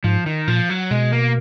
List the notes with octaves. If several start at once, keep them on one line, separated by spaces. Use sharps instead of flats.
G#2 F3
D#3
A#2 F3
F#3
B2 G#3
A#3